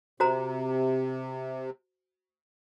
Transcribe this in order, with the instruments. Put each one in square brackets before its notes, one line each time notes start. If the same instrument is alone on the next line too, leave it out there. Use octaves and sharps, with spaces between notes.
[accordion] C3 [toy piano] F#4 C5 A#5